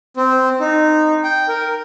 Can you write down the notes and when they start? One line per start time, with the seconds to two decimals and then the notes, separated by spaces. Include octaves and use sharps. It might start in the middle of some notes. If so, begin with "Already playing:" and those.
0.17 C4
0.60 D#4
1.23 G5
1.48 A#4